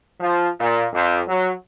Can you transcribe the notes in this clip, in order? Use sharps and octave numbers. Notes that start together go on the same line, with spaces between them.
F3
A#2
F2
F#3